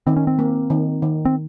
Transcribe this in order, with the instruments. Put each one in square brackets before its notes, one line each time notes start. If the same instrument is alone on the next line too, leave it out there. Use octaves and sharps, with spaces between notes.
[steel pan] D#3 [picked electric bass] C4
[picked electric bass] C#4
C4
[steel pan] A#3
D#3
D#3
[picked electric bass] C4